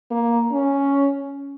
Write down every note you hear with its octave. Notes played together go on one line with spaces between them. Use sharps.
A#3
C#4